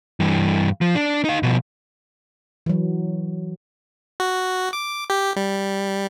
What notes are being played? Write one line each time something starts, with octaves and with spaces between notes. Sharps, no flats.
G2 E3
F3
D4
D#4 F5
B2 F3
E3 F#3
F#4
D6
G4
G3